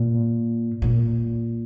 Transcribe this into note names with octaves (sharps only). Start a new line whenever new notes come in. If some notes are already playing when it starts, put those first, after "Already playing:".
Already playing: A#2
A#2